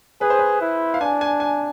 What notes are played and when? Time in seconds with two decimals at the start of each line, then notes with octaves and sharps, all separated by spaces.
0.21 G#4 B4
0.30 C5
0.39 B4
0.61 E4
0.94 F5
1.01 D4 G#5
1.21 G#5
1.40 G#5